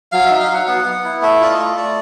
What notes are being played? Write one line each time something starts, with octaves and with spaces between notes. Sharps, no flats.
F#3 F5
D#4 E5
F5
F#3 F#5
B3 F#5
B3
E4
A3 E5
F4 D5
D#5
A3
A3 D5